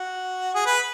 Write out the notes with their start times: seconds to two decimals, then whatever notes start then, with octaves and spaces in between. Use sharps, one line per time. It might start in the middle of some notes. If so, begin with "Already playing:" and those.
Already playing: F#4
0.55 G#4
0.67 B4